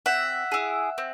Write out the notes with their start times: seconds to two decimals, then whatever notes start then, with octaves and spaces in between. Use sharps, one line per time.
0.06 C4 E5 F#5
0.52 E4 G#4
0.98 C4